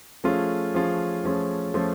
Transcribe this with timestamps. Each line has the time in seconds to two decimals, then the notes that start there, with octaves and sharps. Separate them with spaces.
0.24 F3 A3 C#4 F4 G#4
0.74 F3 A3 C#4 F4 G#4
1.24 F3 A3 C#4 F4 G#4
1.74 F3 A3 C#4 F4 G#4